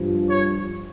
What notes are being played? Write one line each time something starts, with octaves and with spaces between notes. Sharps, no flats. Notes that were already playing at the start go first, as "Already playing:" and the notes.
Already playing: G2 F3
C#5